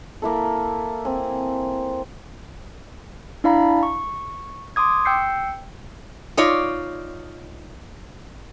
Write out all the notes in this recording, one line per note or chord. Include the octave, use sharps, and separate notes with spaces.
A#3 E4 A4
C4 G#5
D4 E4 D5 F5 A#5 B5
C#6
C6 D6 D#6 G#6
G5 E6 G6 C7 C#7
D#4 F4 C#5 D5